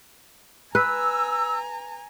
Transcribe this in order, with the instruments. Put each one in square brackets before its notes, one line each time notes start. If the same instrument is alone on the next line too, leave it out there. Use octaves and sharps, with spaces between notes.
[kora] B4 [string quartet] G#5 A#5 [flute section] E6